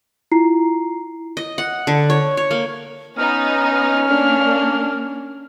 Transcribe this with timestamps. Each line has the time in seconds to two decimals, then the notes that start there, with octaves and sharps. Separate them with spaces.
0.32 E4 F4 A#5 C7
1.37 D#5
1.58 F#5
1.87 D3
2.10 C#5
2.37 C#5
2.51 A#3
3.17 B3 C#4 D#4 F6
4.08 A#3 D4